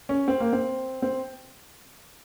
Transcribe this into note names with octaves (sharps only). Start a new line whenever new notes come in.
C#4
C4
A#3
C4
C4